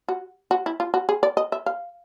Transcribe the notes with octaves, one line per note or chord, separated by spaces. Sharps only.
F#4
F#4
E4
F4
F#4
G#4
D5
D#5
E5
F5